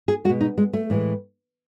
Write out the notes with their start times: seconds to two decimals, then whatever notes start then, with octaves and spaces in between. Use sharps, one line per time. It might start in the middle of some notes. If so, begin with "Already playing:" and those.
0.08 G#4
0.25 G#3 F#4
0.29 B2
0.41 D#4
0.58 G#3
0.73 A3
0.90 A2 E3 G#3